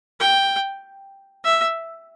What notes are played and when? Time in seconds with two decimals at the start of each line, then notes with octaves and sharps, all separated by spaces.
0.20 G5
1.44 E5